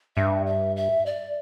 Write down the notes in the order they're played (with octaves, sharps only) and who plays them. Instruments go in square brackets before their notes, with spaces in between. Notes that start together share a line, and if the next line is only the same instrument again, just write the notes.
[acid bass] G2 [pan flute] E5
[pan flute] E5
E5
D5